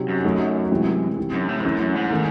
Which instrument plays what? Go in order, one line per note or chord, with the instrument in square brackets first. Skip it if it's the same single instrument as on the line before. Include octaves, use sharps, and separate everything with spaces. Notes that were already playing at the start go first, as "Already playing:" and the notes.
Already playing: [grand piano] C3 F#3 C4 D#4
[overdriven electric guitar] F#2
[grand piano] F#3 A3 D#4
C3 E3 G#3 C4 E4
C3 E3 C4 D#4
[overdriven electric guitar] F#2
A2
G#2
[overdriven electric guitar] F#2 [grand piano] E3 A3 C#4 E4
[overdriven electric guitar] F#2
G#2
[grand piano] D#3 A3 C#4